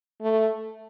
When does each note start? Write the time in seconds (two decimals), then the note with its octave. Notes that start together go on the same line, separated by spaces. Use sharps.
0.21 A3